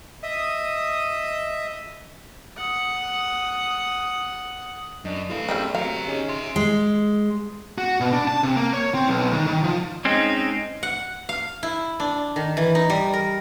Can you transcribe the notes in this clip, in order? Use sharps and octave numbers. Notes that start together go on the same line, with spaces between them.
D#5 E5 D#6
F#5 D#6
F#2 D4 D#5
E3 A3 A4 F5
F#2 G3 C4 D4 G#4 E6
F#3 C4 G4 F5 A#5
C#4 D#4 G#4
E5 C6
G#3
F#4
B2
D4
A5
C3
A#3
C#5
C4
B1
D#3
D#3
F3
G#3 C4 C#4 D#4
F#5
F5
E4
D4
D#3
E3
D#4
G3
A#4